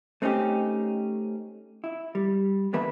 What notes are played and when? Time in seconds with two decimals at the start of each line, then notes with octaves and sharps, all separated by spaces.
0.22 A3 C4 C#4 D#4 G4
1.84 E4
2.15 G3
2.73 D3 E3 A#3 B4 E5 B5